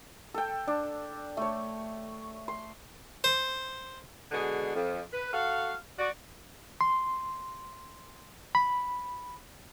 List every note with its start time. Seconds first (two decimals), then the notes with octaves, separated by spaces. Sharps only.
0.34 A4 G5
0.67 D4
1.37 A3 C#5
2.48 C6
3.24 C5
4.32 B2 D3 G#3 G#4
4.75 F2
5.13 B4
5.32 F#4 A4 F5
5.99 F#4 D5
6.81 C6
8.55 B5